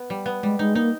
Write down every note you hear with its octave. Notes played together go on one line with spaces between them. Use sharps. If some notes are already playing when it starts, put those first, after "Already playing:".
Already playing: B3
G3
B3
G3 G#3
G#3 D#4
A#3 D#4